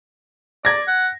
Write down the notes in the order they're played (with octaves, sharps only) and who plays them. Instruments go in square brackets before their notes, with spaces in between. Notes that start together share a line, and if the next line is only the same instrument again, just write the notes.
[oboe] D5 [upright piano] G#6 A#6
[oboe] F#5